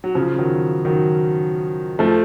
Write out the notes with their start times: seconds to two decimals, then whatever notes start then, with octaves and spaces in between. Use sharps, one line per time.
0.04 F#3
0.15 C#3 F3
0.38 D#3 F#3
0.85 D#3 F#3
1.99 F3 A3